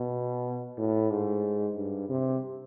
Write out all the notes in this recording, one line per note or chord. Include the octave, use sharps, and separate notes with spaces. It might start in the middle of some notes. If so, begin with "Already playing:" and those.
Already playing: B2
A2
G#2
G2
C3